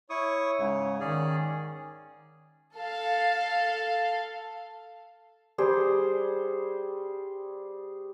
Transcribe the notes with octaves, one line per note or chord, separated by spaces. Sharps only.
E4 C#5 C#6 D#6
G#2 C#3
D#3 C#4 G#4 D5
A4 F5
G3 G#4 C5